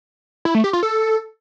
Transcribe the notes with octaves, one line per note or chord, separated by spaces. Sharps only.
E4
A3
G4
F4
A4